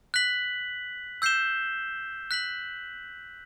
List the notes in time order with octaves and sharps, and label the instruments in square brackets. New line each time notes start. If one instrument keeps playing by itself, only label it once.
[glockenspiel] F#6 B6 F#7
E6 G6 C7 E7 G7
F#6 B6 F#7